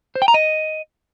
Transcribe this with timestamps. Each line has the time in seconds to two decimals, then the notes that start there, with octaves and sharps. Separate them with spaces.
0.16 C5
0.22 G5
0.28 A#5
0.34 D#5